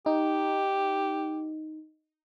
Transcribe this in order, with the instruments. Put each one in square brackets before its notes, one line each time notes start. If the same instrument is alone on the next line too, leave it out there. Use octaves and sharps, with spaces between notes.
[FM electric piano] D#4 [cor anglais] G4